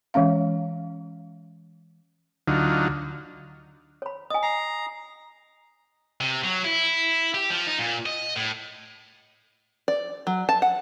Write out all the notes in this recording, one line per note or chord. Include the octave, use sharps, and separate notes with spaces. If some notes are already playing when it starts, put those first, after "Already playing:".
E3 G#3 C#4 F5
D2 D3 F#3 D#4 F4
C#5 B5
D#5 G#5 D#6
A#5 C7
C3
F#3
E4
G4
F3
D#4
A#2
D#5
A2
D5
F#3
A5
F#5